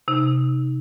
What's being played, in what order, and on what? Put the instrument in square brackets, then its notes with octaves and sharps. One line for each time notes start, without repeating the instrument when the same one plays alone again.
[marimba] C3 D#4